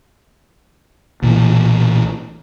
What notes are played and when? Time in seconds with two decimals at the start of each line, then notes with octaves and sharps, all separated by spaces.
1.22 B1 A#2 E3